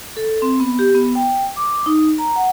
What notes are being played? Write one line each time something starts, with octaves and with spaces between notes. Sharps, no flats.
A4
C4
B3
G4
B3
G5
D6
D#4
A#5
F#5